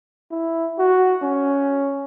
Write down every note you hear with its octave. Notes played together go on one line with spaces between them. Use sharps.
E4
F#4
C#4